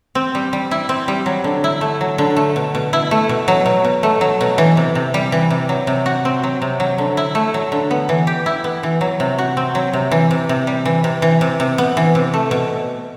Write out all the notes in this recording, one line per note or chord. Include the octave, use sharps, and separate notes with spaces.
C4
G3
G3
E4
C4
G3
F#3
D3
E4
A3
F#3
D3
A3
B2
B2
E4
A3
B2
F#3
B2
B2
A3
F#3
B2
E3
C3
C3
G3
E3
C3
F#3
C3
F#4
C4
F#3
C3
F#3
D3
E4
A3
F#3
D3
B3
E3
G4
E4
B3
E3
F#3
C3
F#4
C4
F#3
C3
E3
C3
C3
G3
E3
C3
E3
C3
C3
B3
E3
C3
A3
B2